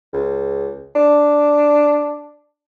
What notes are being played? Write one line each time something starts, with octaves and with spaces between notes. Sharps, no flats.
C#2
D4